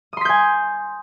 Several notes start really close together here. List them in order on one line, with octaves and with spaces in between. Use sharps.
D#6 C6 B6 G6 G#5